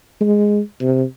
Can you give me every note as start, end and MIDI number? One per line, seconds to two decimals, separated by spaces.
0.21 0.60 56
0.81 1.04 48